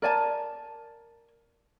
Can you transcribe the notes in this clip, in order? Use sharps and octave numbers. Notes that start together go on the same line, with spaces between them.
A#4 D5 G#5 A5